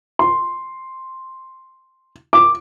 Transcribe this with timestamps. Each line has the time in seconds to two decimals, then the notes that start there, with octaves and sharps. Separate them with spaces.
0.19 C6
2.33 D6